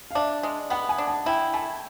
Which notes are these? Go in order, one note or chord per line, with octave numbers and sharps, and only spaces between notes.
F5
D4 E5
G#3
B3 F#5
G#5
D4
A5
E4 G5
A3 G#5